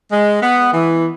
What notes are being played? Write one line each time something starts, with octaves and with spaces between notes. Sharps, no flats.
G#3
B3
E3